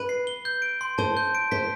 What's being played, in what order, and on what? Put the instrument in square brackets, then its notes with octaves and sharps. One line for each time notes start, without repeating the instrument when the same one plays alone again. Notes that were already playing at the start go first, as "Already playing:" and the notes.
Already playing: [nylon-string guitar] B4
[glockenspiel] C7
G7
G6
D7
C6
[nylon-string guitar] C5 [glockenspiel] A5
[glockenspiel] G6
D7
[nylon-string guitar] C5 [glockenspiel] B6